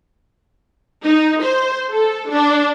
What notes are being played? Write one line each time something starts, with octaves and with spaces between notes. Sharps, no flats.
D#4
C5
A4
D4